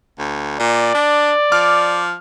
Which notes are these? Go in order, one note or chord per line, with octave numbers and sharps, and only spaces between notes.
D2
A#2 D5
D4
F3 D6 F6